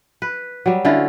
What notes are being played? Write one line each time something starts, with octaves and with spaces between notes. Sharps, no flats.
B4
F#3 G3
D3 C#4 E4 F4